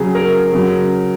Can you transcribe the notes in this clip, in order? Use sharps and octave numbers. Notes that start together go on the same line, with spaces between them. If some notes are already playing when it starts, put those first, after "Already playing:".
Already playing: C#3 F#3 G#4
A#4
C#3 F#3